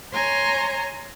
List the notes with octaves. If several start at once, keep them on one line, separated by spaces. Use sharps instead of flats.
C#5 G#5 A#5 C6